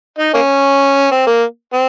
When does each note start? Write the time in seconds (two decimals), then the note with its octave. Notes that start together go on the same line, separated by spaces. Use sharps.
0.19 D#4
0.34 A#3 C#4
1.12 C4
1.27 A#3
1.74 C4